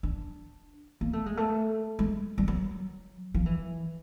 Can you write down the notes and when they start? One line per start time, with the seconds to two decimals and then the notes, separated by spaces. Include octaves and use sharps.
0.03 D4
1.01 A#3
1.13 A3
1.26 G#3
1.37 A3
1.99 G#3
2.38 G3
2.48 F#3
3.34 F3
3.46 E3